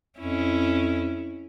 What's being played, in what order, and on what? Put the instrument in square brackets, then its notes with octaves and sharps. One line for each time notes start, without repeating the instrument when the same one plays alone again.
[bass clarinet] F2 [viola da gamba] C#4 E4